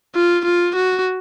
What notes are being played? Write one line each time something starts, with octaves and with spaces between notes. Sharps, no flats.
F4
F4
F#4